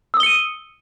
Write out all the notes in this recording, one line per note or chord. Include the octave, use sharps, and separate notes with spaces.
D#6 E6 C#7 D#7 G7